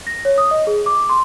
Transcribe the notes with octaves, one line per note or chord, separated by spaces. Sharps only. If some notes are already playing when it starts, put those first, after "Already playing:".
A#6
C#5
D#6
D#5
G#4
D6
C6